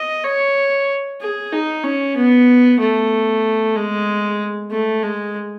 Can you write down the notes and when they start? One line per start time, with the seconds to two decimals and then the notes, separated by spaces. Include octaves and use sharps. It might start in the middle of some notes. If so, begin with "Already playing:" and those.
Already playing: D#5
0.24 C#5
1.21 G#4
1.53 D#4
1.83 C#4
2.17 B3
2.79 A3
3.76 G#3
4.71 A3
5.03 G#3